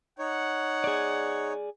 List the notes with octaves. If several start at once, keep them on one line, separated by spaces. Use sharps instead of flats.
D#4 C#5 F#5
G#4 D5